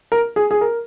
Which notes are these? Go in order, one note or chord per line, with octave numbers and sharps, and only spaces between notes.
A#4
G#4
G#4
A#4